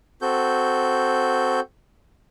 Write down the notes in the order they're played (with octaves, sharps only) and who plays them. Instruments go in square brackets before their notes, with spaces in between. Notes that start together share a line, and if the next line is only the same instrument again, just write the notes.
[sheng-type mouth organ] C4 F#4 A4 G6